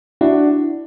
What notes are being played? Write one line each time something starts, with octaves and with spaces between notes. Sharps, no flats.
D4 E4 F#4